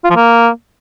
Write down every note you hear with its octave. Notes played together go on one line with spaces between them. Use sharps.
F4
F3
A#3